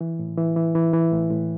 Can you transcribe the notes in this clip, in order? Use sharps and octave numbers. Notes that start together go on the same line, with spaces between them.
E3
A2
E3
E3
E3
E3
A2
A2